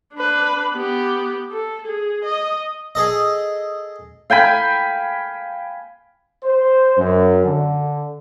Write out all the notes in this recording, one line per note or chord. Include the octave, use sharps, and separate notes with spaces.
D4 B4
B3 G4
A4
G#4
D#5
G#4 A4 D#5
F5 G5 G#5 B5
C5
F#2
D3